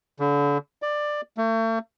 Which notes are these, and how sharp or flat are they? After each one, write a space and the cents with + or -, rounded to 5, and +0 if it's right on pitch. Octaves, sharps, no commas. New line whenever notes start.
D3 -35
D5 +15
A3 +40